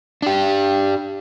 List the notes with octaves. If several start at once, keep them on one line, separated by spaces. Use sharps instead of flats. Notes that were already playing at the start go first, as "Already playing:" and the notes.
D4 G4